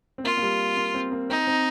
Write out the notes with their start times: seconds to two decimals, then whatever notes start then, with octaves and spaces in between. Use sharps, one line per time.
0.18 C4
0.24 A#3 F4
0.37 A#3
0.42 G3
0.77 A#3
0.94 C4
1.12 A#3
1.30 C4 D#4
1.47 C4